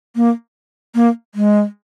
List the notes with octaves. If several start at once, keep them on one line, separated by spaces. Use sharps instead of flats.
A#3
A#3
G#3